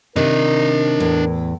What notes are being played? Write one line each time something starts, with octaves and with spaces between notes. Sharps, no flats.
C3 D#3 D4 A#4 D#5
E2 A2